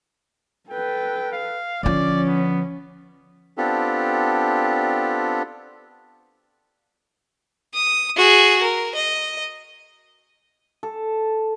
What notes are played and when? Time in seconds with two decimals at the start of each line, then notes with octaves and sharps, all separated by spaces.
0.70 A4 B4 G5
1.32 F5
1.83 D3 F3 C#4 D5
2.28 B3
3.58 B3 C4 D4 F4 G4 A4
7.74 D#6
8.17 F#4 G#4
8.62 A#4
8.95 D#5
10.83 A4